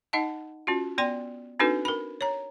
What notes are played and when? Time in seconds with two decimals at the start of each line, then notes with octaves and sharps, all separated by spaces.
0.13 D#4 D#5 F#5 A5
0.67 C#4 F4 F#4
0.98 B3 D5 G5 C6
1.59 C4 D4 D#4 F#4 A4 B4
1.85 A#4 B5
2.21 C#5 A#5